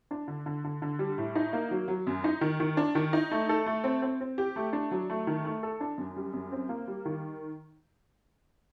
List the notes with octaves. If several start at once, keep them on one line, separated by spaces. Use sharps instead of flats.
D4
D3
D3
D3
D3
G3
A2
D#4
A#3
F#3
F#3
F#2
D#4
D#3
D#3
D4
D#3
D#4
A3
A4
A3
C4
C4
C4
G4
A3
D4
F#3
A3
D#3
A3
A4
D4
F#2
G3
F#2
C4
A#3
G3
D#3